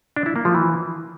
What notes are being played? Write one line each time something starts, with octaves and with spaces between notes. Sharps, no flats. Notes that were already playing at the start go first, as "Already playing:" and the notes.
D4
E4
A#3
F3
E3